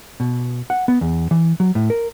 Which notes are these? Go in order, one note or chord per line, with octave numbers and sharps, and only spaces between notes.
B2
F#5
B3
E2
E3
F#3
A2
A#4